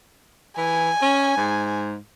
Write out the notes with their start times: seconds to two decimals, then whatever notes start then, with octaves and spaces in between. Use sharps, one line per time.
0.57 E3 G#5
1.02 C#4
1.37 G#2